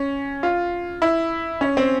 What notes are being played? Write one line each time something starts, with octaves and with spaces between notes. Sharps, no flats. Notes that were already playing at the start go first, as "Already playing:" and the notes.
Already playing: C#4
F4
E4
C#4
C4